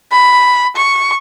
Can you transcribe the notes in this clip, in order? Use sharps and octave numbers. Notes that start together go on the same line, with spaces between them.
B5
C#6